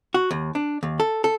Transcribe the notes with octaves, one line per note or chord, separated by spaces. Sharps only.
F#4
D#2
D4
D#2
A4
A4